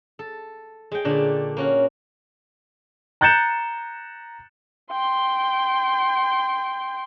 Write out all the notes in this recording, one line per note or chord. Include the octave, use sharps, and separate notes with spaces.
A4
G#3 G5
A#2 D3 A3 D4
A#3 C#4 F#4
A#5 F#6 G6 A6 C#7 E7
G5 C6